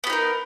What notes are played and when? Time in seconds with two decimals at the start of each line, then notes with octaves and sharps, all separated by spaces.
0.04 B3
0.07 G4
0.10 D#4
0.13 A#4